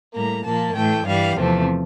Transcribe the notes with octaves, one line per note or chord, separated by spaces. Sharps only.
A2 G3 A#3 A#5
A#2 F3 A#3 A5
A2 E3 A3 G5
G2 E3 G3 F5
E2 C3 F3 A3 C4